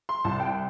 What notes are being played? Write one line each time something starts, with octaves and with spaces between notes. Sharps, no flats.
C6
C2 A5
G5